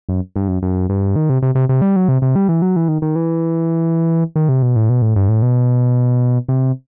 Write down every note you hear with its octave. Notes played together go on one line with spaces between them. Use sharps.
F#2
G2
F#2
F#2
G2
D#3
C3
C3
C3
C3
G3
F#3
C3
C3
G3
E3
F#3
E3
D#3
D#3
E3
D#3
C3
B2
A2
B2
A2
G2
A2
B2
C3